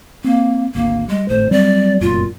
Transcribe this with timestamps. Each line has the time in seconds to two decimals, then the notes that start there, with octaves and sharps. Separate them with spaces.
0.24 A#3 C4
0.75 G#1 D2 A#3
1.08 G3 G#3
1.28 G#1 A2 C5
1.51 F#3 G3 C4 D5
2.01 F1 F#2 A#2 F4